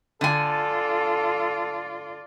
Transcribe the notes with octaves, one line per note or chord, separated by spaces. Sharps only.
D3 F4 A4 D5 G#5